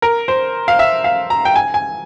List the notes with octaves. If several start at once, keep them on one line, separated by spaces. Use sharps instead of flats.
A#4
C5
F5
E5
F5
A#5
G5
G#5
G#5